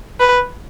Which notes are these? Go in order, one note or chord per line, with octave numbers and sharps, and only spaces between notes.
B4